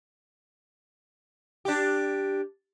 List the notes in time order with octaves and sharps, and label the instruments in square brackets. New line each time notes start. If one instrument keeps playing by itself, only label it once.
[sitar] D4 G4